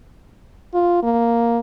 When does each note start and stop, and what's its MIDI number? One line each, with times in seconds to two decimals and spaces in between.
0.74 1.02 65
1.03 1.59 58